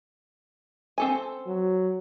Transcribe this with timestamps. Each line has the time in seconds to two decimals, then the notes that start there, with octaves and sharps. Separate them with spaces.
0.98 C4 A4 G#5
1.47 F#3